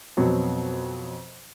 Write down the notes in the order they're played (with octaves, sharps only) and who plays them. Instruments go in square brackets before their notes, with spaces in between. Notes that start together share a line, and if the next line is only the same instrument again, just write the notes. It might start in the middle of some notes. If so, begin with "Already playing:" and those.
[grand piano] F2 B2 F#3 C4